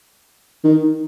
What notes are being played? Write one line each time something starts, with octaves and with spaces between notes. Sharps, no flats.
D#3